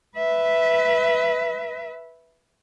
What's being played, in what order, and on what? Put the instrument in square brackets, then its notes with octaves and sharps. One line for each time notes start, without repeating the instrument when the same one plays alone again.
[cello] B4 E5